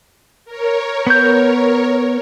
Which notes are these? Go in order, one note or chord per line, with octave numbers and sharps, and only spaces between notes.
A#4 C#5
B3 G6